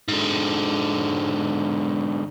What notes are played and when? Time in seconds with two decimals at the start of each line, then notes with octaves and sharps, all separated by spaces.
0.08 G#2 D3